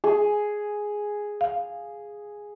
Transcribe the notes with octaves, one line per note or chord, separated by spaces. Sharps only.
G#4
F5